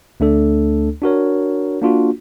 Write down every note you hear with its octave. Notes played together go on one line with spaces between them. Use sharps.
D2 A3 D4 A4
D4 F#4 A#4 C#5
A#3 D4 F4 F#4